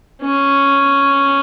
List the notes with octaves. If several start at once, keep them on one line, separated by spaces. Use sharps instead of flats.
C#4